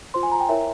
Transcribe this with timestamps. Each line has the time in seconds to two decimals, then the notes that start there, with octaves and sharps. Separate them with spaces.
0.14 F4 C5 C6
0.23 G#5
0.32 A#5
0.40 G5
0.49 E4 A#4 C#5 E5